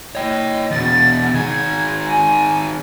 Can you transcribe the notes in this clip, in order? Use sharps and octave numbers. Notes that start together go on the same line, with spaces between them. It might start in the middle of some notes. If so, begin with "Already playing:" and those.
C#5 D#5 G5
E2 B2 A6
D#3 G#4 G#6
G#5